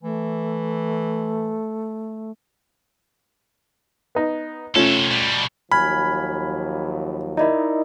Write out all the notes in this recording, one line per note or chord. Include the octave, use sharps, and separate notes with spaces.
E3 A3
B3 D#4
C3 A3 C#4 F4 A4
B2 G3
D#2 F3 F#3 G#5 B5 F6 G#6
D#4 E4 A#4 D5 D#5